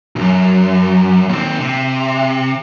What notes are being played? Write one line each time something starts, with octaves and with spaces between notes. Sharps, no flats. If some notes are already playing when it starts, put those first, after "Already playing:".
C2 F#2
D#2 C4
C3